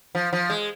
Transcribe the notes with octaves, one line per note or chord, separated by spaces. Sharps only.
F3
F3
G#3